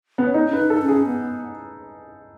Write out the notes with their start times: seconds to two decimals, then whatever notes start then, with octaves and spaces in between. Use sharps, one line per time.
0.18 B3
0.27 C#4
0.34 B3 D#4
0.48 C#4
0.53 B4
0.58 D#4
0.70 A4
0.82 C#4
0.88 G#4
1.06 B3